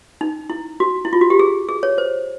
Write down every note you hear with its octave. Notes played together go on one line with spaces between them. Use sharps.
D#4
E4
F#4
E4
F4
F#4
G4
G#4
G#4
C#5
C5